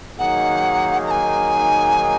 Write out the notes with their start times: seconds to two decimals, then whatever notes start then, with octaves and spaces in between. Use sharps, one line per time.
0.19 D#3 F#3 A#3 D#4 G#4 F#5
1.07 A#5
1.11 G#5